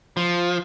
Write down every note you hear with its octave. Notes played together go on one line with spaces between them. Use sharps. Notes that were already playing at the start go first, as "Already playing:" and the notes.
F3